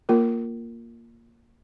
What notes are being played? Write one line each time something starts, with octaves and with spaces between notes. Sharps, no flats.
A#3 F4 A#4